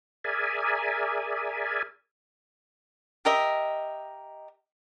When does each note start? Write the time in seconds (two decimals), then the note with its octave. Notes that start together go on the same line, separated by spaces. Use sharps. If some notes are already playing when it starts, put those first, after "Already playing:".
0.24 G#4 A#4 D5 E5 G#5
3.25 G4 A#4 D#5 E5